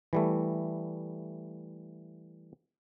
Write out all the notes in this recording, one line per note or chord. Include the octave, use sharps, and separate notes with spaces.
E3 G3 A3